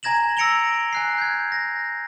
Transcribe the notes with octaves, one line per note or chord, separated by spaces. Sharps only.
G#5 A#5 G#6 A#6 E7 F#7
E6 A#6 C#7 D7 F7 G7
G#5 F#6 C7
G6 G#6
A#6